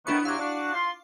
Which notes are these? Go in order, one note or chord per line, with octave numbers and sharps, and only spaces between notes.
A2 D#3 B3 D4 E4 C#6
C3 F#3 F5 D6
D4 F#4
F4 C6